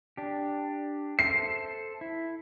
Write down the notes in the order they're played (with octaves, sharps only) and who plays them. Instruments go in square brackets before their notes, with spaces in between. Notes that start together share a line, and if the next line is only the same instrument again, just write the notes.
[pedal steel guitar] D4 G4
[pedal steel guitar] A4 C5 E5 [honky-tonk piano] C7
[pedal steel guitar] E4